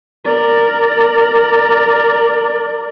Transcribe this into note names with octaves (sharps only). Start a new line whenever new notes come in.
A#4 D5